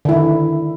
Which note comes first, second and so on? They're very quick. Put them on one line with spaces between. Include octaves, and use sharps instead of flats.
D3 E4 D#3